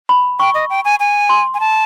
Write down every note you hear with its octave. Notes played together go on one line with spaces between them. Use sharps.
B5
G5 C#6
D#5
G5
G#5
G#5
C6
G#5
A5